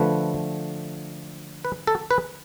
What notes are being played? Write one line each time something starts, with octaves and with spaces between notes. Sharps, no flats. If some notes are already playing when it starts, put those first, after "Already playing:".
Already playing: D3 F3 A3 B4
B4
A4
B4